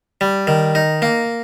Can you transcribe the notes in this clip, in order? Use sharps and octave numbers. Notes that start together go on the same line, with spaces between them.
G3
D#3
D#4
A#3